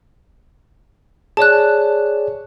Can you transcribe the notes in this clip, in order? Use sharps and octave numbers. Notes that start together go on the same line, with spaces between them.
G#4 C#5 D5 A5 F#6